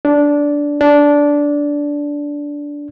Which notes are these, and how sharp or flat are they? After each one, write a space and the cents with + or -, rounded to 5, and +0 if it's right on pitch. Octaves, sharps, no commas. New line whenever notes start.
D4 -10
D4 -10